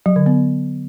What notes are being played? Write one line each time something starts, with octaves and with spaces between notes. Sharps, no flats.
F#3
D3
B3